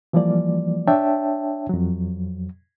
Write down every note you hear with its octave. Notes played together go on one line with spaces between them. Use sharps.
E3 F3 G3 A#3 D5
D4 C#5 E5 G5 A5
F2 F#3